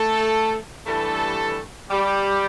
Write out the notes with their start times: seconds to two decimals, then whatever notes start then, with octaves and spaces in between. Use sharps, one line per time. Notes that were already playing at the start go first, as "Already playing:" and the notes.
Already playing: A3 A4
0.87 G2 E3 G3 A3 A4
1.90 G3 G4